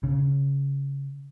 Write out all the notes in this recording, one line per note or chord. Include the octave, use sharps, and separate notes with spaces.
C#3